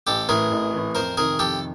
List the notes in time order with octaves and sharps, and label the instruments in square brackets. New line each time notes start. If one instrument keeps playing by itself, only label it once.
[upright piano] A1 [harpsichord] G4 A4
[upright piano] A2 E3 [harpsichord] G#4 A#4
[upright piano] A1
A2 E3
[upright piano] F2 [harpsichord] A#4 C5
[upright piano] C3 D#3 [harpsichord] G#4 A#4
[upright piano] F2 [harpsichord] G4 A4